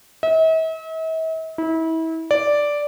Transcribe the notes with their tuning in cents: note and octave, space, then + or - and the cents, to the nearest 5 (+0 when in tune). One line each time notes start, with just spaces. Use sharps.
E5 -45
E4 -30
D5 -5